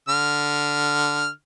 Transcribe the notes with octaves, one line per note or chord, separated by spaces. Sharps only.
D3 F6